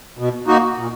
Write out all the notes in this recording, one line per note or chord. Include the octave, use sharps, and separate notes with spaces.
B2
A#3 D#4 F#4
A#2